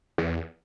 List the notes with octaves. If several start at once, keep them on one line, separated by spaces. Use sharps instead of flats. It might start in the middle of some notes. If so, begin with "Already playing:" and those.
E2